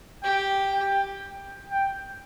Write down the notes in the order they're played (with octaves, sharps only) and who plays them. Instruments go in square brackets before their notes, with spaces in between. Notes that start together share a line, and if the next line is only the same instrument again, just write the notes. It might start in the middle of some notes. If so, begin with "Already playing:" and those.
[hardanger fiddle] G4 [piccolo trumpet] G5
[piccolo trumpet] G5
G5